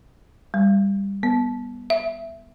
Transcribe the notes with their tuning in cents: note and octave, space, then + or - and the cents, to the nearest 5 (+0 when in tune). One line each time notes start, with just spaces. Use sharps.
G3 +15
B3 -15
E5 +10